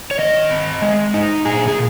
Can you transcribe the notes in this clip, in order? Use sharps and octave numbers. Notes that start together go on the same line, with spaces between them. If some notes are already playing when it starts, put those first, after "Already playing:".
C#5
D#3 D#5
C4
G#3
D#4
A#2 G#4
G#4